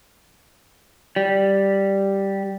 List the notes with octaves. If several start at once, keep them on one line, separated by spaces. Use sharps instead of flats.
G3